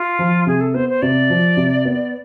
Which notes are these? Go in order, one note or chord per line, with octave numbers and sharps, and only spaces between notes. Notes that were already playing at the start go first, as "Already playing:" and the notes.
Already playing: F4
F3
C3 G#4
A4
B3 C5
C5
C3 D5
F3
C3
B3